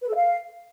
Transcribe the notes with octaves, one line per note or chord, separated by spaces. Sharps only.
B4
A4
F5